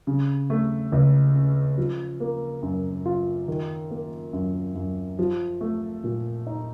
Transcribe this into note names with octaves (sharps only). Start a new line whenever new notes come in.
C#3
A3
C#2
C#4
F3
A#3
F#2
F4
D#3
A#3
F#2
F#2
F3
A3
A#2
D#4